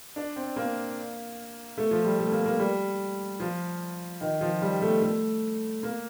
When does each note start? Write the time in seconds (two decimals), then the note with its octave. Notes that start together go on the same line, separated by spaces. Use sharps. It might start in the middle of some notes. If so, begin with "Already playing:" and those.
0.16 D4
0.36 C4
0.56 A#3
1.78 A3
1.91 F3
2.05 G3
2.19 A3
2.32 A#3
2.46 A#3
2.59 G3
3.40 F3
4.21 D#3
4.41 F3
4.62 G3
4.82 A3
5.02 A3
5.83 A#3